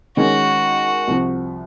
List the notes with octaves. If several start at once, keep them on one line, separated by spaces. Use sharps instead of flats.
D#3 G#3 C#4 F#4
C2 C3 F3